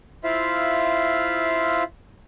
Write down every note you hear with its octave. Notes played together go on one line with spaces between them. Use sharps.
E4 F4 C5 E5 F5